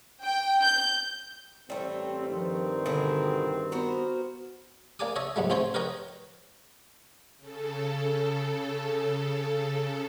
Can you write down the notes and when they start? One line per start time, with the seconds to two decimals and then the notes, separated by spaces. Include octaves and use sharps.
0.24 G5
0.63 G6
1.70 A1 G3 A3 C4
2.30 G2 D#3 F3 C4
2.86 B2 D3 E4 G#4
3.72 B3 F#4 A#4 C5
4.99 A#3 D5 G#5 A5 D6 D#6
5.16 C#5 D#5 E5 A5
5.36 D#2 G#2 F#3 G3 A3
5.50 A1 C4 C5 C#5 G5 A5
5.74 A#4 B4 C#5 D#5 G5
7.37 C#3 A4